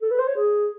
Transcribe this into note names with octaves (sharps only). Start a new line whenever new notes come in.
A4
B4
C5
C#5
G#4